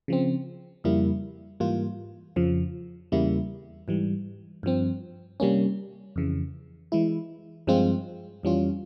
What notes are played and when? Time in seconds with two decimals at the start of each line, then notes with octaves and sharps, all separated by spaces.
0.08 C#3 F3 C4
0.84 F2 C#3 G3 A#3 E4
1.60 G#2 E3 G3 A#3 F4
2.36 F2 C#3 F3
3.12 E2 C#3 G3 A#3 E4
3.88 G#2 E3 G3
4.63 G2 F3 C4
5.40 C3 G3 A#3 C#4
6.16 F2 C#3 E3
6.92 E3 G#3 E4
7.67 G2 F3 G#3 C4 F4
8.43 F2 E3 G3 C#4 F4